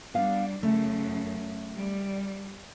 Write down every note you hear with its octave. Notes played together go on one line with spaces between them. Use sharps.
G3 B3 D4 F5
F#2 C#3 A3
G3